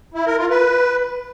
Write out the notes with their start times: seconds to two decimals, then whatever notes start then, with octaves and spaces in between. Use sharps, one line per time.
0.14 E4
0.26 A#4
0.38 F4
0.50 B4